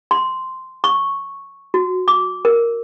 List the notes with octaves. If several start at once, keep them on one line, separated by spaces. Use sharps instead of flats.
C6
C#6
F#4
D6
A#4